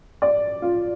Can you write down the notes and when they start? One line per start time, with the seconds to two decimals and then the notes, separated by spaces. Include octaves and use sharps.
0.22 D5
0.62 F4